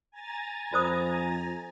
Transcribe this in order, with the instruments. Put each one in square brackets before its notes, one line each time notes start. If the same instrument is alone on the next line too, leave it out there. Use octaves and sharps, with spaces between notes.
[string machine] G#5 A#5 A6
[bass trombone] F2 [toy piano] F4 C5 D#6